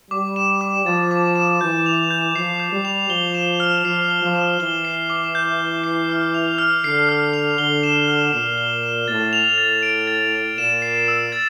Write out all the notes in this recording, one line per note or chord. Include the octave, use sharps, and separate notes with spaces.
G3 D6
E7
D6
F3 A6
D6
E7
E3 G6
F7
G6
F3 C7
G6
G3
F7
F3 G7
E7
F6
F3 C7
G7
F3
E7
E3 G7
C7
D6
G6
G7
C7
F6
F7
F6
D3 C7
F6
F7
D3 G7
E7
F6
A#2 C7
G7
E7
A2 A6
F7
A2
A6
D7
A6
F7
A#2 E7
C7
E6
A6